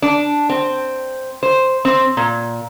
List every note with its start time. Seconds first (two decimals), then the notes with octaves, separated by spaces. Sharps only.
0.02 D4
0.50 C4
1.43 C5
1.85 C4
2.17 A#2